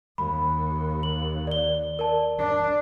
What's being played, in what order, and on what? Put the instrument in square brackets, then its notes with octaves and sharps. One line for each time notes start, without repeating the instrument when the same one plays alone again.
[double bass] D#2 [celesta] B5
[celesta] F#7
D5 G7
A#4 D5 A5
[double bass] D4